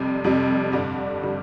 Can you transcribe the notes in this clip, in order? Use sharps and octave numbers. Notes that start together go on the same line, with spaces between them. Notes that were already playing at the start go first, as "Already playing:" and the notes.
Already playing: F2 C3 G3
F2 C3 G3
G2 D3 G3
D3 G3